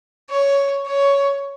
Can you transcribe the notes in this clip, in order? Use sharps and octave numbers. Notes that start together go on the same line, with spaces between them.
C#5
C#5